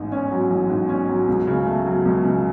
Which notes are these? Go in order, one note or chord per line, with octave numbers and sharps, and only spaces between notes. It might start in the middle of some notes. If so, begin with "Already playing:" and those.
Already playing: A1 G#2
C#4
F#3
A1
G#2
C#4
F#3
C#2
C#3
A3
F#3
C#2
C#3